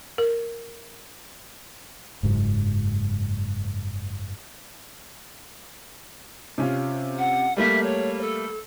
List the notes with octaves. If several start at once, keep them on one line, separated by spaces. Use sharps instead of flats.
A#4
F#1 G#2 F#3
C3 C#4 F4
F#5
G3 A3 A#3 E5
C#5
A4